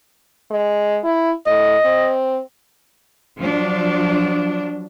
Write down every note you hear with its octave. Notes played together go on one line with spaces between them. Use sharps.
G#3
E4
A2 D#5
C4
F3 F#3 D4